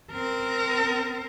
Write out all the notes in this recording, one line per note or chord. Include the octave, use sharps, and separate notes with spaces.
C4 A#4